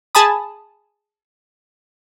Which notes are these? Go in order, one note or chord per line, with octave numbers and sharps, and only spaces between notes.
G#4 G#5 A5 B5 D#6